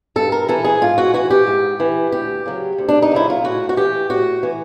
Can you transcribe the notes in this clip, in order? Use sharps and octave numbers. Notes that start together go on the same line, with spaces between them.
G2 A4
A#4
E3 A4
G#4
G#2 F4
F#4
E3 F#4
G4
G#2
E3
D2 G4
C#3 F#3
D2
D4
D#4
C#3 F#3 E4
F4
A2 F#4
F#4
E3 G4
A2 F#4
E3